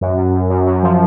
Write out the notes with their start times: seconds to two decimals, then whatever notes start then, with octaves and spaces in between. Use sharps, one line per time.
0.01 F#2
0.18 F#2
0.34 F#2
0.50 F#2
0.67 F#2
0.83 F3